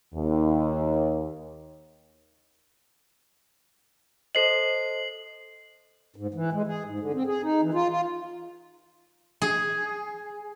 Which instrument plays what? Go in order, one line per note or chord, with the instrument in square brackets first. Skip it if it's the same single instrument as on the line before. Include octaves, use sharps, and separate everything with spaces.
[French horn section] D#2
[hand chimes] A4 C5 D#5 [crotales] C7 F#7
[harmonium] G#2
E3
G#3
G#4
G#2
D3
C4
G#4
D#4
E3
F4
F4
[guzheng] G#4